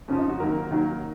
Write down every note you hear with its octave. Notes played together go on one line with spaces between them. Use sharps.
F2 C#3 F3 C#4
D#4
F#4
D#2 D#3 F#3 A#4
D#2 D#3 F#3